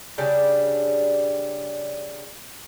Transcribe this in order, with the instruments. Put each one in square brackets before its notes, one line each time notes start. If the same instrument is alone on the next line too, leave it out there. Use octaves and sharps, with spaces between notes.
[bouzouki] C#3 G3 D4